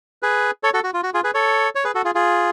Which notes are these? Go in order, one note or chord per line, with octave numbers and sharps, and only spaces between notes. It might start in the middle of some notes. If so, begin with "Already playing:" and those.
G#4 B4
A4 C#5
F#4 A4
F#4
F4
F#4
F4 G#4
G#4 B4
A4 C#5
C#5
G#4 B4
F#4 A4
F4 G#4
F4 G#4